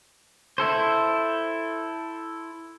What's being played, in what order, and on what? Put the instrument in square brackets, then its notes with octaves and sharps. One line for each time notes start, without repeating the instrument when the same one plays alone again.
[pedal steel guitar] E4 A4 C5